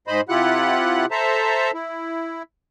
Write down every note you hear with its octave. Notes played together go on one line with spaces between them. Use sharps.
G#2 C5 D#5 B5
C3 E4 F4 G4 F#5 F#6
A4 C5 E5 A5 A#5
E4